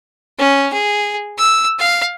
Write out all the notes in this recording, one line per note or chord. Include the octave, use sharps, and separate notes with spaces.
C#4
G#4
E6
F5